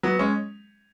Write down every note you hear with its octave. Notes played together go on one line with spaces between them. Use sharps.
F#3 B3
G#3 C#4